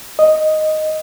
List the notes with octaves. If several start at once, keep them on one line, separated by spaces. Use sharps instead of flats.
D#5